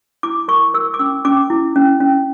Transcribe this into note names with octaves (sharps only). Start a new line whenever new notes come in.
E4 D6
A#4 C#6
A#4 E6
D6
C#4 E6
C#4 D6
E4
C#4
C#4